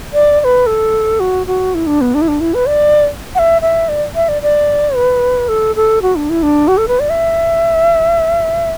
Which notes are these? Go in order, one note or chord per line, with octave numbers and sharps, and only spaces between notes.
D5
D5
B4
A4
F#4
F#4
E4
D4
B3
D4
E4
D4
E4
B4
D5
F#5
E5
E5
D5
E5
D5
D5
B4
A4
A4
F#4
D4
E4
D4
F#4
A4
B4
D5
E5